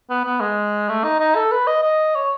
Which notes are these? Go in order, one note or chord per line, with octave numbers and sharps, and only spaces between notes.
B3
B3
G#3
A3
D#4
D#4
A4
B4
D#5
D#5
C#5